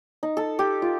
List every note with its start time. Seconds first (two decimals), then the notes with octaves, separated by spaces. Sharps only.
0.23 D#4
0.37 A4
0.59 G4
0.82 F4